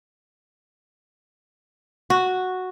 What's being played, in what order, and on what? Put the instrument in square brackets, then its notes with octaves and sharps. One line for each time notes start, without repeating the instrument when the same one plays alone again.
[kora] F#4